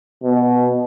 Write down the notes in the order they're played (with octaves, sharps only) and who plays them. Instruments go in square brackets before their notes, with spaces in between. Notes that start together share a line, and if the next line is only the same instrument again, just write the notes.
[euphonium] B2